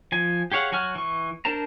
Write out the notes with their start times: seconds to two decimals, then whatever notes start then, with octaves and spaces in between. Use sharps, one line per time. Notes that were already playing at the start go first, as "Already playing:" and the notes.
0.12 F3 G#5
0.52 G4 G#4 C#5 F5 F#5
0.72 F#3 F#4 G#5 F6
0.95 E3 C#6
1.45 D4 A#4 C5 A5 A#5